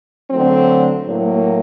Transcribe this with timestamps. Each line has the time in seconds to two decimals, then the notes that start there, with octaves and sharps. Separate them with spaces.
0.30 D3 F#3 A3 C4
1.06 A2 F#3 A#3